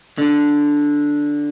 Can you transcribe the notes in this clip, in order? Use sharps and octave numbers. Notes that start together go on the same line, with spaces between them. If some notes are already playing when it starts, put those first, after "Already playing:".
D3